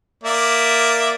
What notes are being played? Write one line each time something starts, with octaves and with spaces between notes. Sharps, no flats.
A#3 D5 E5